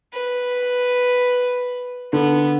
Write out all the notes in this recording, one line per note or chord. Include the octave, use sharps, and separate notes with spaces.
B4
D3 B3